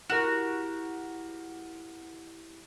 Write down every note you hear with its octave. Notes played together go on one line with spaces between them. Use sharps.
E4 F#4 G4 A#4 E7